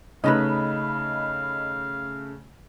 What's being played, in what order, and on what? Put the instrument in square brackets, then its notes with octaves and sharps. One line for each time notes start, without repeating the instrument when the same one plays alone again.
[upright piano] C#3 A3 [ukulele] C#4 D#4 B4 [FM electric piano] D#5 B5 [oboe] F5